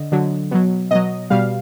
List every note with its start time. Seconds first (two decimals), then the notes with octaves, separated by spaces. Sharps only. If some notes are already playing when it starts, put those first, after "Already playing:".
Already playing: D3 D#5
0.12 D3 F#3
0.51 B2 F#3
0.91 B2 F#3 D#5
1.30 B2 G3 F5